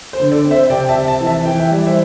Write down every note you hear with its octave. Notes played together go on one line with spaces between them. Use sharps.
C5
D3
A4 D5
C4
C5 E5
C3 D5 G5
E5 A5
C3
E5 A5
E3
E5 A5
E3 G5
E5
G3 D5
C5 E5